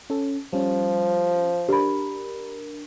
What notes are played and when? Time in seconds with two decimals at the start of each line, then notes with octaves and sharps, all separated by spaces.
0.10 C#4 A4
0.53 F3 G3 C#4
1.69 D4 G4 A#4 B5